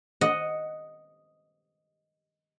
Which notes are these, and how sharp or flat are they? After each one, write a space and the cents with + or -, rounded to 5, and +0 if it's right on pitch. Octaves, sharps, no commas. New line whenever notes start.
D#5 +0 F#5 +0